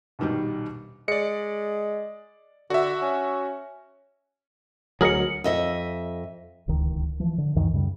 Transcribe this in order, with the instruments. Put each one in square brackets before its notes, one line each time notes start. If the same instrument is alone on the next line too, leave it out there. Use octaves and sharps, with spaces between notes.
[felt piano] A#1 B2 D#3 G3 D#4
[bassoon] G#3 [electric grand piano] D5 C#7
[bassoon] D3 [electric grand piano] F#4 E5
[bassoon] C#4
[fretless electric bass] D2 F#3 [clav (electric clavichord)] G#4 A#4 D#5 [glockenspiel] C#7 F#7
[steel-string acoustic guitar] F2 D#5 E5
[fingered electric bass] D1 C#2 D#3
E3 F3
D3
C#2 F#2 D#3 E3
F#2 C#3 G3